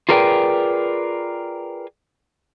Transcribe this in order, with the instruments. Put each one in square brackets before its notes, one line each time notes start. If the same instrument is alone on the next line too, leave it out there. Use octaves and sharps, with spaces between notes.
[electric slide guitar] F4 G#4 A#4 B4 D5 G5